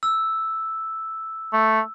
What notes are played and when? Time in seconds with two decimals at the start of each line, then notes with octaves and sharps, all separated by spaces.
0.03 E6
1.53 A3